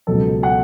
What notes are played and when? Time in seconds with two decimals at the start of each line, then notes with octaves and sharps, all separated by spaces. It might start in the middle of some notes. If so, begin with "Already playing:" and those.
0.07 C#2 B2 F#3 A4
0.43 F#5